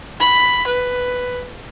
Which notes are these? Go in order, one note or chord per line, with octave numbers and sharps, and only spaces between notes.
B5
B4